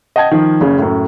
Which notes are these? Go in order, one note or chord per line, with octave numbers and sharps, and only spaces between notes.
D#5 F#5 G5 A5 G#6
D#3 F3
F#1 C#3
F#2 A2